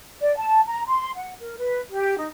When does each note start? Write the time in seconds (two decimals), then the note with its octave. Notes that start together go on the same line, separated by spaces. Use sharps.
0.20 D5
0.36 A5
0.67 A#5
0.87 C6
1.16 F#5
1.41 A#4
1.57 B4
1.91 G4
2.18 D#4